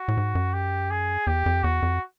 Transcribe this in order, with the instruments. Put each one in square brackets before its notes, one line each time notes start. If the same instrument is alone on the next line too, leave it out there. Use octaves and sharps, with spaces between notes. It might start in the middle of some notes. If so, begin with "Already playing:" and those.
Already playing: [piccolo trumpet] F#4
[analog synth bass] A2
G#2
F#2
[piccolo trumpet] G4
G#4
[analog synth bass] E2 [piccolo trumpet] G4
[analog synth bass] F2
[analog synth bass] E2 [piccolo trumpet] F#4
[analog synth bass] F2